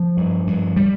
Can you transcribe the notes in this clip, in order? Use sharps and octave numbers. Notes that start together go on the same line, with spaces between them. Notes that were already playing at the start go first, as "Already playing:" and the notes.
Already playing: F3
G2
G2
G3